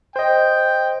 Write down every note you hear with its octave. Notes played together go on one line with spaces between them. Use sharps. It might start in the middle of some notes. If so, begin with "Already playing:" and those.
C5 D#5 G5